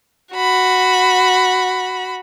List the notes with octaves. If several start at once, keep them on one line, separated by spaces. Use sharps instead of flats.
F#4 B5